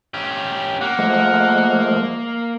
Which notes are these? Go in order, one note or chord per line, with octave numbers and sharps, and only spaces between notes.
C#4 G4
A#3 F#5
F3 G#3 A3